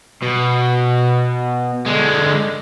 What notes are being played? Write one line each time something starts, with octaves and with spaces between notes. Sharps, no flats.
B2
D3 G#3